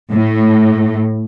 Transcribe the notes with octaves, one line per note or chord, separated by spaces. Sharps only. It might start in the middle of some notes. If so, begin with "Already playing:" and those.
A2